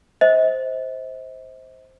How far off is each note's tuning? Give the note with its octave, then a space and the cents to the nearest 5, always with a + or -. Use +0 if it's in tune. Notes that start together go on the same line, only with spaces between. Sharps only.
C5 +0 D#5 +45